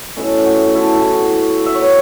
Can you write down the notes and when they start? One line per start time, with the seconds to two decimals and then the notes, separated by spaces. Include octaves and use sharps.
0.17 B2 A3 C#4 E4
0.46 F#4
0.63 F#4
0.75 E4 A4
0.95 E4
1.03 F#4
1.66 E5
1.75 C#5
1.82 B4